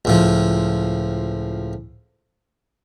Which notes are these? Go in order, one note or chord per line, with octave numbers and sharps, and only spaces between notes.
C#2 A2 F3